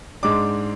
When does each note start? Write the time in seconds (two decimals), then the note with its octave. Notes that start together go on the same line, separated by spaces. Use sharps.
0.23 G#2 G#3 D4 D6